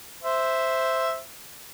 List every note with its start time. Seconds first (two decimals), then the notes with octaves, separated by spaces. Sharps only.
0.23 C5 E5